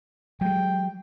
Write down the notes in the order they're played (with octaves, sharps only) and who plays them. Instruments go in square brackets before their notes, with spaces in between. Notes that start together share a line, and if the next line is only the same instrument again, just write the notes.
[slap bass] F#3 G#3 [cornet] G5